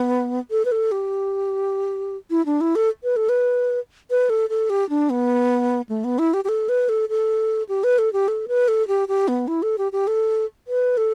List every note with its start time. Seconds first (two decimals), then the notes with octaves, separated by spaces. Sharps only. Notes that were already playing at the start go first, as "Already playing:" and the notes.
Already playing: B3
0.51 A4
0.65 B4
0.72 A4
0.92 G4
2.31 E4
2.46 D4
2.61 E4
2.75 A4
3.04 B4
3.16 A4
3.29 B4
4.11 B4
4.30 A4
4.50 A4
4.70 G4
4.90 D4
5.10 B3
5.89 A3
6.04 B3
6.19 E4
6.34 G4
6.44 G4
6.49 A4
6.69 B4
6.89 A4
7.09 A4
7.69 G4
7.84 B4
7.98 A4
8.13 G4
8.28 A4
8.48 B4
8.68 A4
8.88 G4
9.08 G4
9.28 B3
9.48 E4
9.62 A4
9.78 G4
9.92 G4
10.07 A4
10.68 B4
10.97 A4